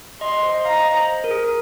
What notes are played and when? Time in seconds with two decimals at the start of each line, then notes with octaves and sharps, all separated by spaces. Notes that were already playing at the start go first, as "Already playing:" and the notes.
0.21 D#5 C6
0.32 D#5
0.43 C5
0.54 D#5
0.65 F5 A#5
0.80 D#5
0.94 C5
1.24 A#4
1.31 G#4
1.44 A#4